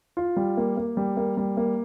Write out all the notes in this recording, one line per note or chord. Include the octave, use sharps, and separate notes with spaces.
F4
G3
A#3
A#3
G3
A#3
G3
A#3